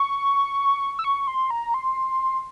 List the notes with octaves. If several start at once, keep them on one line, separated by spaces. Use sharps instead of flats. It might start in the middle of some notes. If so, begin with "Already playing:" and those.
Already playing: C#6
E6
C#6
C6
A#5
C6